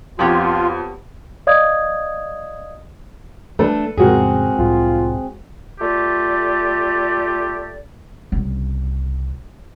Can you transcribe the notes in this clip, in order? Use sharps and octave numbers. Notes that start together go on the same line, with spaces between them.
F2 B3 F4 G4 C#5
D5 D#5 F5 D#6 G#6
A3 D4 A4 B4
F2 A2 C#3 G#3 C4 F#4 G#4 A#4
C2 A2 F4
A3 F4 G4 D5
C2 C#3